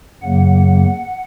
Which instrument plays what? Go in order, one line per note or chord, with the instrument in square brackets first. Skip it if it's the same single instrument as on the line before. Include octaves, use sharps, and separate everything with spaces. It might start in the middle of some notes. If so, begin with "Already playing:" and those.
[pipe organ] F#2 C#3 F#3 A#3 F#5